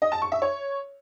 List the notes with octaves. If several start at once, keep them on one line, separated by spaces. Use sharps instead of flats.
D#5
A5
C#6
E5
C#5